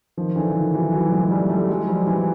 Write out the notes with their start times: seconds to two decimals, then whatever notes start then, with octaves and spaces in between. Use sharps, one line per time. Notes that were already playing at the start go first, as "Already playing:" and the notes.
0.17 D#3 F3
0.36 D3 E3
0.54 D#3 F3
0.74 E3 F#3
0.93 E3 F#3
1.12 F#3 G#3
1.31 G3 A3
1.49 G3 A3
1.69 F#3 G#3
1.87 F3 G3
2.07 E3 F#3